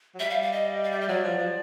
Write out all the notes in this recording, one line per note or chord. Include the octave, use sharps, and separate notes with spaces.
F#3
G3 E5
F5
F5
D#5
F5
E5
D#5
F#3 D5
F3
F3